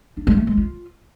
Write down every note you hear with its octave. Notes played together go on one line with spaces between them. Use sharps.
D4
G#3
A3
G#3
F4